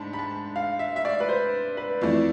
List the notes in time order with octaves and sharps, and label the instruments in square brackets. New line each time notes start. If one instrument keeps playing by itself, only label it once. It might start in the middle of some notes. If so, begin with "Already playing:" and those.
Already playing: [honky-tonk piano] G#2 D4 [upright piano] A5 B5
[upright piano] B5
A5
F5
E5
E5
D5
B4
C5
B4
[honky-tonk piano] F2 E3 A3 E4 [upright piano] D5